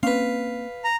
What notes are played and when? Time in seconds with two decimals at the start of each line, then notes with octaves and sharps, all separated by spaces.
0.03 A#3 C4 C#4 B4 F5
0.84 A#5